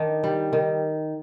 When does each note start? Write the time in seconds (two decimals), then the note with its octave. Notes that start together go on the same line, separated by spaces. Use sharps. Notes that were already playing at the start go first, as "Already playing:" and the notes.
Already playing: D#3 D4
0.24 G3
0.53 D#3